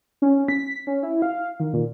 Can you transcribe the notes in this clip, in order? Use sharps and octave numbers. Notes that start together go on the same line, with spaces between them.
C#4
B6
C#4
E4
F5
D#3
A#2